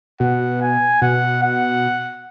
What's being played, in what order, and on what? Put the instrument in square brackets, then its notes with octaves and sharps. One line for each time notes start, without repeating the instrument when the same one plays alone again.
[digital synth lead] B2 [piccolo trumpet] F#5
[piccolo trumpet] G#5
[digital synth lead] B2 [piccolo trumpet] F#5
[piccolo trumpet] F#5